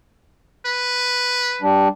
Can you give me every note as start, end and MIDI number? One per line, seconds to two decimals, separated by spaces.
0.66 1.68 71
1.62 1.88 55
1.62 1.88 62